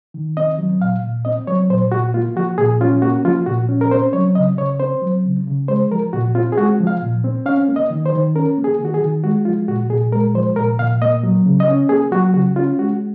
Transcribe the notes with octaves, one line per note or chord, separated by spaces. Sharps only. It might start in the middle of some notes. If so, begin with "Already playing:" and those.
D#3
C4 D#5
F#3
A#2 F5
A#2
C4 D#5
F#3 C#5
A#2 C5
A#2 F#4
A#3 F4
F3 F#4
A#2 G#4
C#4 F4
A#3 F#4
F3 F4
A#2 F#4
C#4
A#4
C4 C5
F#3 C#5
C#3 D#5
C#3 C#5
C4 C5
F#3
C#3
C#3
G#3 C5
F3 A#4
A#2 F#4
C4 F4
G#4
G#3 F#4
F3
F5
A#2
C4
C#4 F5
A#3
D#5
D#3
C5
D#3
C#4 A#4
A#3
G#4
D#3
F#4
G#4
D#3
G#3 F#4
F3 F4
A#2 F#4
A#2 G#4
G#3 A#4
F3 C5
A#2 A#4
A#2 F5
A#3 D#5
F#3
C#3
D#5
C#4
A#3 G#4
F#3 F#4
C#3 F#4
C#4 F4
G#3 F#4